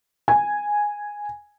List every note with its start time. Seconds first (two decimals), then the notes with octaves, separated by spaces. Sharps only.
0.28 G#5